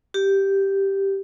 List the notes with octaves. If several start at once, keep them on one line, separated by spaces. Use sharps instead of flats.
G4